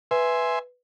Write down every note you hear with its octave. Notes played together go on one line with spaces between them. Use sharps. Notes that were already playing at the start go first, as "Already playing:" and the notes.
B4 E5 G#5 C6